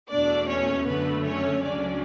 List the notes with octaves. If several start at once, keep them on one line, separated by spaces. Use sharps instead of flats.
E2 B2 A3 D4 D5
C#4 C#5
F#2 D3 A3 B3 B4
C#4 C#5
C#2 C#3 F#3 A3 C#4 D4 D5